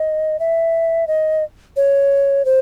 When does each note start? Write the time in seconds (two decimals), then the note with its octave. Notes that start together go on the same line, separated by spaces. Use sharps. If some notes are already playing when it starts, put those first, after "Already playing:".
Already playing: D#5
0.39 E5
1.08 D#5
1.76 C#5
2.45 C5